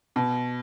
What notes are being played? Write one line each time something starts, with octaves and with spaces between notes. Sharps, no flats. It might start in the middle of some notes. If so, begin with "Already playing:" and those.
B2